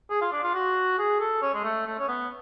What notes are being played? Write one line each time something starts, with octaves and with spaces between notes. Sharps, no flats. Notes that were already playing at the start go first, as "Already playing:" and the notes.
G#4
F4
D4
F4
F#4
G#4
A4
C#4
G#3
A3
A3
C#4
B3